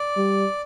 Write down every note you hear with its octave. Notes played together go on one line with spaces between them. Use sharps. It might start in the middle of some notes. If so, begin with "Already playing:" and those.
Already playing: D5
G3